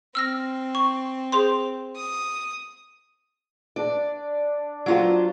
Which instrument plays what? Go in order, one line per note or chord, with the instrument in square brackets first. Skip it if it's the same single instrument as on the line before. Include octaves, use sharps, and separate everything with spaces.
[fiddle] C4 [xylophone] E6 F6 A#6
[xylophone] C#6
G#4 C5 C6
[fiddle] D#6
[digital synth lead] D4 [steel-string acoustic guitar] D5
[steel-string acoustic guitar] F#3 F4 C5